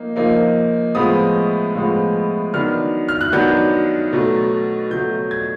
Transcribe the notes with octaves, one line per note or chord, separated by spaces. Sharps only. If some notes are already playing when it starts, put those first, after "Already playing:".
Already playing: F3 A#3 D#4
F3 A#3 D#4
A2 F3 G#3 B3 D#6
A2 F3 G#3 B3
D#3 F#3 B3 D4 F6
F6
F#6
D#3 F#3 B3 D4 G6
B2 F#3 A3
B2 F#3 A3 G6
G#6